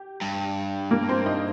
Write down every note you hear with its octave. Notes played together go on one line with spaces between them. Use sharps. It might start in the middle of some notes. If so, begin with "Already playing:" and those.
Already playing: G4
G2
A#3 A#4
C4 C5
D#4 D#5